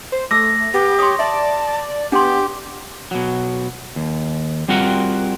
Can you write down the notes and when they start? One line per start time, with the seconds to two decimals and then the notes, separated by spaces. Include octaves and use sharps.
0.12 C5
0.31 A3 D6 E6 A#6
0.74 B3 G4
0.99 C#5 C6 D#6
1.19 D5 E5 A5
2.12 B3 D4 G4 C6
3.11 B2 F#3
3.96 D#2
4.68 G3 C4 F4 F#4 A#4 F#5